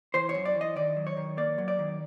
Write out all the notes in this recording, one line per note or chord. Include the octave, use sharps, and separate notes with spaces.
E3 C5
C#5
F#2
D5
E3
D#5
D#3 D5
F#3
C#5
D#3
A#3 D5
F#3
D5
D#3